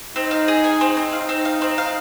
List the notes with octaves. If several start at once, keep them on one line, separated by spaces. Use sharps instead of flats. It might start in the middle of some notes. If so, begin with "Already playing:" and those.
C4 D#4
F5
G#4
G#5
C4
C4
D#4 F5
C4
F5
C4
F5